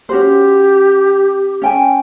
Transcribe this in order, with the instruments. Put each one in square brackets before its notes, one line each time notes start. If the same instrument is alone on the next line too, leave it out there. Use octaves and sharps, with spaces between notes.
[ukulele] C#4 F#4 C5 [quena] G4
[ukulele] C#4 G5 G#5